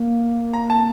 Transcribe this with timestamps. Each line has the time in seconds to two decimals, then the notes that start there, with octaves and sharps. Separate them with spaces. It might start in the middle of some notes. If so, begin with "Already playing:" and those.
Already playing: A#3
0.53 A#5
0.70 A5